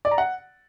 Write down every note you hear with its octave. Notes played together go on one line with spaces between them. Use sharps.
D5
A#5
F#5